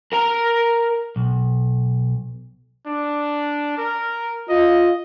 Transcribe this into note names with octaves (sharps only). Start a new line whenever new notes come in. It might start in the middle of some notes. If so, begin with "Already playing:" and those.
A#4 A#5
B1
D4
A#4
F4 D#5